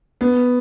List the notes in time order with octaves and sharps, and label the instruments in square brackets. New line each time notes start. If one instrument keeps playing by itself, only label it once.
[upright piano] B3